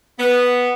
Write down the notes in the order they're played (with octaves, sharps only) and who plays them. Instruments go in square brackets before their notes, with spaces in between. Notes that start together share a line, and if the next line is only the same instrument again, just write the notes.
[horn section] B3